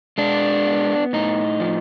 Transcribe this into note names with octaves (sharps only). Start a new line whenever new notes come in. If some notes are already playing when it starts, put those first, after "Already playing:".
G#3 D4
B3
A2 D#4
F3